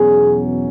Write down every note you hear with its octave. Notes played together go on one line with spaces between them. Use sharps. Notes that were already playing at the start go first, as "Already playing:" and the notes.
Already playing: E2 B2 F#3 C#4 G#4